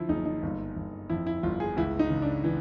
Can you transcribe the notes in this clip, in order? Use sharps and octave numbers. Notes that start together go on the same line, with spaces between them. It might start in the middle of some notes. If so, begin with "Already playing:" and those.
Already playing: D3 F3 E4 F4
F#1 D#4
D#4
G1
G1
F2 E4
E4
G1 F4
G#4
C#2 E4
D#4
C#3
D4
E3